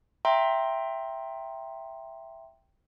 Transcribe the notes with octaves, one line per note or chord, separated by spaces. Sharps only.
E5 G5 A#5 C6